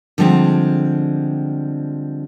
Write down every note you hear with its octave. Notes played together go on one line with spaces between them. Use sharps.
D3 F3 G3 G#3 C4